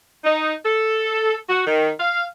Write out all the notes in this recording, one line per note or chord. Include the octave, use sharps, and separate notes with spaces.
D#4
A4
F#4
D#3
F5